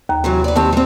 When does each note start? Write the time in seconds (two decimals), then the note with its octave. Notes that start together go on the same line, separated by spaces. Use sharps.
0.09 D#2 A#5
0.24 C3 E3 F#3
0.44 B4 D5
0.56 D#3 C4 G4 A5
0.73 A#2 G3 C4